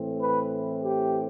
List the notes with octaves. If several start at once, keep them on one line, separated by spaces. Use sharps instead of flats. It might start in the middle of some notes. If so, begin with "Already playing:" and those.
Already playing: A2 E3 A3 C4
B4
G4